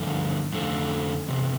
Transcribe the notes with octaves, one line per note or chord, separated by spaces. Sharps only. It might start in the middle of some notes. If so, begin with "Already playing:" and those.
Already playing: G2 D3 F3 A3
F2 D3 F3 A3
E2 C3